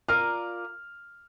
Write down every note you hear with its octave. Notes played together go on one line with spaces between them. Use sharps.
F4 A#4 D5 F6